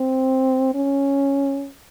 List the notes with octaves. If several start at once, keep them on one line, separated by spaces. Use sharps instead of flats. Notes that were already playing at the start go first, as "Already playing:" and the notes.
Already playing: C4
C#4